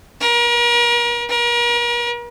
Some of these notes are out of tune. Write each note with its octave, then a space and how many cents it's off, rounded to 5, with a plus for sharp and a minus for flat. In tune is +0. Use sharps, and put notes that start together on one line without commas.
A#4 +40
A#4 +40